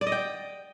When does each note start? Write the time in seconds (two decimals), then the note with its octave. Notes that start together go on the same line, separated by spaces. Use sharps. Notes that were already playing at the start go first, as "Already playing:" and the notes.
0.01 D5
0.07 D#5
0.12 G5